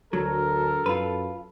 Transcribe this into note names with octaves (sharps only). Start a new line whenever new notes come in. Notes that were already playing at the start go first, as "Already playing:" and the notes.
D2 F#3 A4 A#4
F#2 F4 B4